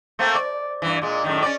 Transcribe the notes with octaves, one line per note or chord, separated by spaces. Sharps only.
A3 A#3 C4
D5
G2 E3
A#2 G#3
F#2 A2 D#3
C#4 D5